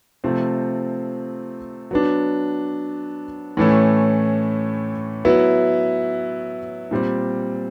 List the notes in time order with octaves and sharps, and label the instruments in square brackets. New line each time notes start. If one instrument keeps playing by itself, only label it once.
[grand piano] C3 F3 A3 C4
F#3 B3 D4
A2 E3 A3 C#4
F#3 B3 E4
A#2 G3 C4